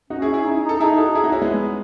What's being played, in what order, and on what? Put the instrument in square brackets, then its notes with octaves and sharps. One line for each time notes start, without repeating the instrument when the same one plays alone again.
[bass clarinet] C#4 [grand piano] D#4 F#4
[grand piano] E4 G#4
E4 G#4
[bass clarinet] D#4
D#4
[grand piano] A4
[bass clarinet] D#4 [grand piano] E4 G#4
[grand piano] F#4 A4
E4 G#4
D#4 F#4
C#4 E4
G#3 B3